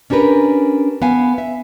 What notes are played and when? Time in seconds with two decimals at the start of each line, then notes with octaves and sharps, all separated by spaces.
0.10 C#4 D4 G4 A#4 B4
1.02 B3 F5 G#5
1.38 E5